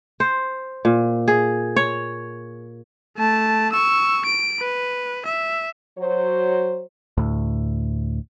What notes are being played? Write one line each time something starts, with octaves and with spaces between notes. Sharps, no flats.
C5
A#2
G#4
C#5
A3 A5
C#6 E6
D7
B4
E5
F#3 C5
D2 A2